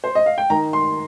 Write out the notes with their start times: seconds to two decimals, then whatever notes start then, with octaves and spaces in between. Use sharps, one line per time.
0.04 C5
0.15 D#5
0.26 F5
0.38 G5
0.50 D#3 A#5
0.73 C6